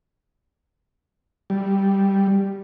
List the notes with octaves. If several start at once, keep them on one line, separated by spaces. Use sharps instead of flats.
G3